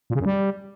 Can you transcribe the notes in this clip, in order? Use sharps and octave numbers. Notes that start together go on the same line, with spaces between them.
A#2
C#3
F#2
G3